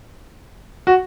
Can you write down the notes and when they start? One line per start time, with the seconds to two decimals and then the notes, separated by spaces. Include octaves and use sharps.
0.87 F#4